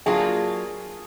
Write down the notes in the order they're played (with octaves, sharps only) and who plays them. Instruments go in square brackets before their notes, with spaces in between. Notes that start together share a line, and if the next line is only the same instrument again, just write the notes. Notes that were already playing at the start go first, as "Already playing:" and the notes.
[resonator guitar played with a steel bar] F#3 A#3 D4 F4 [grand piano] G#4